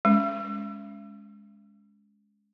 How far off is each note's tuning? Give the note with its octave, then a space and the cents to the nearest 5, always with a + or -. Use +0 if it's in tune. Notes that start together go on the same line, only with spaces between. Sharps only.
G#3 +0 C#4 +10